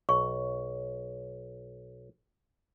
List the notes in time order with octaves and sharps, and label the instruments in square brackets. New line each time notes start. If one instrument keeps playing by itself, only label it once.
[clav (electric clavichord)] B1 [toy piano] C#6